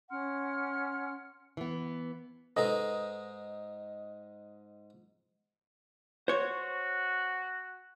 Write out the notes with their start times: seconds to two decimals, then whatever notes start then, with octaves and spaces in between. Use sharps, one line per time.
0.10 C#4 F#5 C6 F6
1.57 E3 B3
2.57 G#2 G#3 D#4 A4 B4 D#5
6.28 F#4 C5 C#5